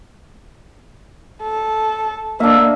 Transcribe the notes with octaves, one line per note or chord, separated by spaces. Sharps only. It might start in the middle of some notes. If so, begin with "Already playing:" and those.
A4
A#3 D4 E5